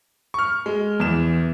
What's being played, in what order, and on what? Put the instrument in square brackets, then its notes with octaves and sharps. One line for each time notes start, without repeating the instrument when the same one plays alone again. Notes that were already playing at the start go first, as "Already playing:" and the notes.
[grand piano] C#6 F6
G#3
[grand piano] E2 E7 [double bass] E3